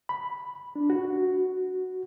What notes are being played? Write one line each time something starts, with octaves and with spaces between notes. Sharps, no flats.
B5
D4
F#4